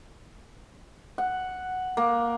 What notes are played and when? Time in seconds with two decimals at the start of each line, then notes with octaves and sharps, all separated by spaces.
1.18 F#5
1.97 A#3